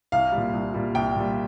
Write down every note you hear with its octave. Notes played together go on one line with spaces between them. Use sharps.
C2 F5
G3
A#2
C2
A#2 G3
C2 G5
A#2 G3